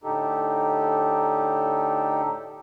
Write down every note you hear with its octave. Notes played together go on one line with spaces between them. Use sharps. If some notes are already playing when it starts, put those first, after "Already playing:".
A2 D3 D#4 G4 A4